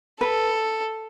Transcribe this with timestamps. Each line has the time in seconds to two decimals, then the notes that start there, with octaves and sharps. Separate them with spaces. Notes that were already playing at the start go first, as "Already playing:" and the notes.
0.21 A4 B4